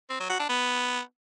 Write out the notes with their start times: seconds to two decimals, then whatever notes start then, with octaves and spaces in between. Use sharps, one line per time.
0.10 C4
0.20 F#3
0.30 F#4
0.39 D4
0.49 B3